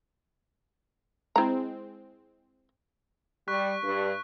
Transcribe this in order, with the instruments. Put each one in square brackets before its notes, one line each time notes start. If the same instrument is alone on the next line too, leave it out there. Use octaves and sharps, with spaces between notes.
[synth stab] G#3 C4 [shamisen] E4 A#5
[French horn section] G3 [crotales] C#6 F#6 B6
[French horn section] G2